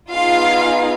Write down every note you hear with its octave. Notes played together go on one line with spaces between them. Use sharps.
B3 D#4 F4 G#4 F5